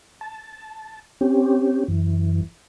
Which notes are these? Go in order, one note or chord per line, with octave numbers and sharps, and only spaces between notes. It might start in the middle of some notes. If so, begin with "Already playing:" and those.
A5
C4 C#4 G4
F#2 E3